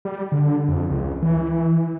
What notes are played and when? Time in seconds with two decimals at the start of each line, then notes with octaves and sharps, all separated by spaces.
0.05 G3
0.32 D3
0.68 F2
0.89 C#2
1.22 E3